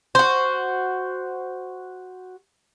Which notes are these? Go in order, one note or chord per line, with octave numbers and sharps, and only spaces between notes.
F#4 C5